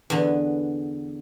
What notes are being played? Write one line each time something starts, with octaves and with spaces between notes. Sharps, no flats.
E2 D3 B3